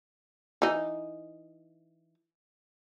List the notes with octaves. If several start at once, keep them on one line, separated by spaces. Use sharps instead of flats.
E3 D#4